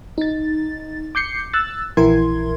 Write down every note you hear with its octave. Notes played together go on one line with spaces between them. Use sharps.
D#4 A6
D6 G6 C7 C#7
E6 F#6 A6
A#1 E3 E4 A#4 C6 G#6